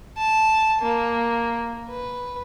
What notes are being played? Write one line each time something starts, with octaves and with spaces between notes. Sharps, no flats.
A5
A#3
B4